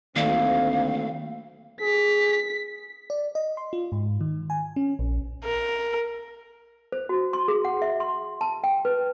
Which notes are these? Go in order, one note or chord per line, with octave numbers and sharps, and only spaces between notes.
D2 A#2 D#3 F#3 A3 C4 D5 F5
G#4 B6
D5
D#5
C6
F4
G#2
D#3
G#5
C#4
A#1
A#4
C5
F#4
C6
G#4
F#5
E5
C6
A5
G5
B4